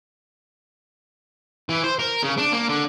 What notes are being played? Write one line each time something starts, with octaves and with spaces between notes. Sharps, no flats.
E3
C5
A#4
C#3
D4
A#3
D3